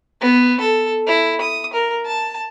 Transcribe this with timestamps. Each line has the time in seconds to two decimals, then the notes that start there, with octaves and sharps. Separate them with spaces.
0.20 B3
0.60 A4
1.07 E4
1.41 D#6
1.73 A#4
2.05 A5